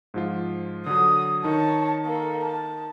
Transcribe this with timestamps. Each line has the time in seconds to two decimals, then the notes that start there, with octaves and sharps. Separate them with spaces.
0.14 G#2 F3 F4
0.86 D3 F#3 D#6
1.44 D#3 D#4 C#5 A5
2.06 A#3 A4
2.45 A5